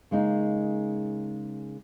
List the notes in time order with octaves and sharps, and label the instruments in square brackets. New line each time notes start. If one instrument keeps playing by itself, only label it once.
[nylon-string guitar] C#3 G#3 A#3 D#4